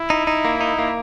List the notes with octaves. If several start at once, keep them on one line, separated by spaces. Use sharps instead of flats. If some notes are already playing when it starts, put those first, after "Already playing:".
Already playing: E4
D#4
D#4
A#3
D#4
A#3